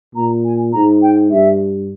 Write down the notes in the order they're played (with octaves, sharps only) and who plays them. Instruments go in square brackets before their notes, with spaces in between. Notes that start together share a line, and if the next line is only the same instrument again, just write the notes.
[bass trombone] A#2 [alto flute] A#5
[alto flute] G#5
[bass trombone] G#2 [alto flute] A#5
[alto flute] G5
[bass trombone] G2 [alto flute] E5